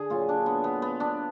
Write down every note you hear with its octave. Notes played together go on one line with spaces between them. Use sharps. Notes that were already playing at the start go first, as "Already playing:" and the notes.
Already playing: D3 G#4
A#2 F#3 F4
D4
B3
B3
B3
D4